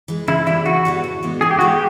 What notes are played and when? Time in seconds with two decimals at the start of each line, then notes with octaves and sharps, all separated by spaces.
0.08 E3 G#3
0.28 C#3 E4
0.47 E3 G3 B3 E4
0.66 C#3 F#4
0.85 E3 G3 B3
1.04 A2
1.23 E3 G#3 B3
1.41 A2 G#4
1.51 G4
1.59 E3 G#3 B3 F#4
1.68 G4